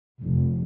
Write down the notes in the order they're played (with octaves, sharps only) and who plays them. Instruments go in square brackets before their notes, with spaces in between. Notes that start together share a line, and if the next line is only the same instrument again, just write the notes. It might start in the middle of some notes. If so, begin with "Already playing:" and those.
[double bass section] F1